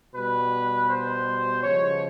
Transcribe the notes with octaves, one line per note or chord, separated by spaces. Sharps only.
B2 G3 B4
C5
C#3 F3 G#3 C#5